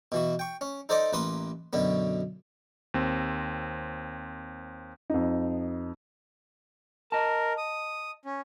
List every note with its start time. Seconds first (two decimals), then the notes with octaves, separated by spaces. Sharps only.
0.12 B2 E3 F#4
0.39 G5 C#6
0.61 C#4
0.89 D#4 A4 C5 D5 D#5 D6
1.13 A1 A#3 B4 B5 C6 D#6
1.73 F#2 B2 D3 B3
2.94 D#2 C4
5.10 F2 D#4
7.12 A#4 D#5 A5
7.58 D#6
8.25 C#4